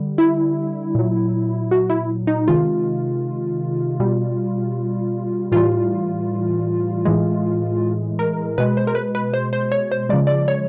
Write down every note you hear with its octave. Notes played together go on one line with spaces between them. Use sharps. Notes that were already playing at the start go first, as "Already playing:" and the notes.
Already playing: D3 G3
E4
A#2 F#3
F#4
E4
D#4
C3 D#3 G#3 F4
B2 G3
A2 E3 G3 F4
A2 E3 G#3
A#4
B2 G#3 B4
C5
A#4
B4
B4
C5
C5
C#5
C5
C#3 F3 G#3 D5
D5
C#5